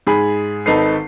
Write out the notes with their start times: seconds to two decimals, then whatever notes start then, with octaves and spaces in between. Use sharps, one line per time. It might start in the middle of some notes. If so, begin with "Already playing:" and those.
0.07 G#2 G#4 B5
0.66 G#1 D#4 A4 B4 C7